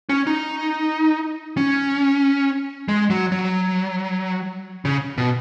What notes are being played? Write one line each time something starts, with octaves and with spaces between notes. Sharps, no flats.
C#4
D#4
C#4
G#3
F#3
F#3
C#3
B2